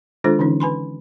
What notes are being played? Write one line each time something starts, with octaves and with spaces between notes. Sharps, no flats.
D#3 G#3 D4 F4 A4 C5
D3 E3 C#4 D#4
B4 G#5 B5 C6